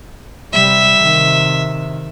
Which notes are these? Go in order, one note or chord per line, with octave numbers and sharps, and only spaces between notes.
C3 G3 E5
C3 D#3